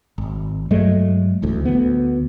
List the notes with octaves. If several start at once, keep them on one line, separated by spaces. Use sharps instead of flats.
G#1
G2 F#3 G#3 A3
D1 A1 D2
D2 B3